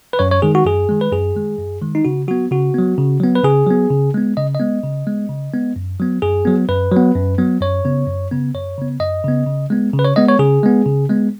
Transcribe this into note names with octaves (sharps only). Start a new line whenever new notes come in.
B4
F#2 C#5
C#5
D#3 G#3 G#4
F#4
F#2 G#4
D#3 G#3
B4
F#2 G#4
D#3 G#3
F#2
D#3 G#3
D#4
C#3 F#4
F#3 B3 F#4
C#3 F#4
F#3 B3
C#3
F#3 B3
B4
C#3 G#4
F#3 B3
C#3
G#3 B3
C#3 D#5
D#5
G#3 B3
C#3
G#3 B3
C#3
G#3 B3
F#2
F#3 B3
F#2 G#4
F#3 B3
F#2 B4
F#3 B3
F#2
F#3 B3
F#2 C#5
C#3 B3
F#2
C#3 B3
F#2 C#5
C#3 B3
F#2 D#5
C#3 B3
C#3
G#3 B3
C#3
B4
C#5
G#3 B3 D#5
C#5
C#3 G#4
G#3 B3
C#3
G#3 B3